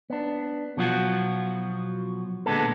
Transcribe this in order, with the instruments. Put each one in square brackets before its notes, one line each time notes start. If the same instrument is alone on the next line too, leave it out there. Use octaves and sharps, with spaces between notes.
[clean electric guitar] B3 D4
B2 F3 F#3 F4 F#4
A#2 D3 G#3 B3 A4